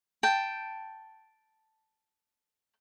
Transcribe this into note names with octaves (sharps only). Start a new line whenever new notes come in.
G5 A5